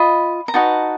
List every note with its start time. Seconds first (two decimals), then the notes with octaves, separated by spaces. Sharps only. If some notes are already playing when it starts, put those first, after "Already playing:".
Already playing: F4 D#5 B5
0.48 A#5
0.54 D#4 F#4 B4 D#5 A5